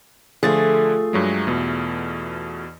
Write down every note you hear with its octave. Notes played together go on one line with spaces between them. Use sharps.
D3 F3 A3 F4 G#4 A6
G2 F#3 G#3
E2 B2